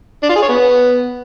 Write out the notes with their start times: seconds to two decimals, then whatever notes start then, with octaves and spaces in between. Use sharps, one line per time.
0.23 D4
0.29 F4
0.35 G#4
0.42 C#5
0.48 B3